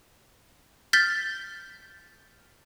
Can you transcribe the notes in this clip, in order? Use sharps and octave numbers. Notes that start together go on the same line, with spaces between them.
F6 G6 A6 B6 G7